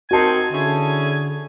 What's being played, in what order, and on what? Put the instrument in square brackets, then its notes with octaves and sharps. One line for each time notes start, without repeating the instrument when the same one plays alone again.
[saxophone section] C4 D#4 A#4 [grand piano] F#4 A5 [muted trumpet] G#5
[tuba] D3 [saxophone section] C#4 E4 G#4